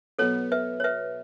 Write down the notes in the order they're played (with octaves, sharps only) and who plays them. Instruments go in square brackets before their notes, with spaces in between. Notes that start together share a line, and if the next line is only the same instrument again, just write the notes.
[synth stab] B2 F#3 B3 [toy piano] A4 C#5
[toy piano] B4 E5
C#5
B4 E5